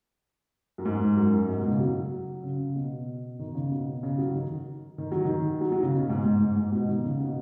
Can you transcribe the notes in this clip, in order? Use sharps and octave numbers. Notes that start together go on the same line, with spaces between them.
F#2
G#2
F#2
G#2
B2
C#3
F#3
C#3
B2
D#3
C#3
B2
C#3
F#3
D#3
D#3
F#3
D#3
F#3
F#3
C#3
B2
G#2
G#2
G#2
G#2
B2
D#3
C#3
B2